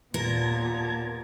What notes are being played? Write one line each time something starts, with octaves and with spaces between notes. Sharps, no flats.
D#2 A#2 B3 A#4 A5 A#5 G#6